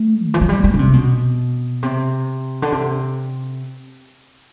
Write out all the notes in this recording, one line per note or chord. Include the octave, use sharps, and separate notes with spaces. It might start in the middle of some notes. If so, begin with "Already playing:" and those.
Already playing: A3
D3
E3
F#3
G3
G3
D3
C3
B2
C3
D3
C3